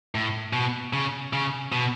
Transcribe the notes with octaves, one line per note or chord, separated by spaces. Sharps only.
A2
B2
C#3
C#3
B2